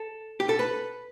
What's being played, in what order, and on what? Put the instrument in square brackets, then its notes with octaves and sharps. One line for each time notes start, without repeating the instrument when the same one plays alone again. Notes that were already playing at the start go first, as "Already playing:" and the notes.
Already playing: [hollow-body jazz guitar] A4
G4
A4
B4